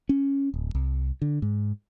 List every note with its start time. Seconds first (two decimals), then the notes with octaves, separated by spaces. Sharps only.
0.09 C#4
0.54 D1
0.75 C2
1.22 D3
1.42 G#2